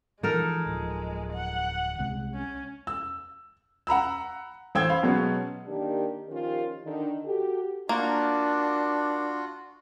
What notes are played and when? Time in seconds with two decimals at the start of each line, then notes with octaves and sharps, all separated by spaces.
0.23 E3 F3 G#3 D#4 A4 A#4
0.66 D1 F3
1.33 F#5
1.99 C2 C3 G#3
2.34 C#4
2.87 E6
3.87 F#5 A#5 B5 E6
4.75 A1 C5 G5 E6 G#6
4.89 F5 B5
5.03 B2 F#3 G#3 B3 C#4
5.66 D#3 A#3 D4 G4
6.28 D#3 F3 C#4 F4 G4 A#4
6.83 D3 D#3
7.24 F#4 G4 A4
7.89 A#3 D4 F4 F#4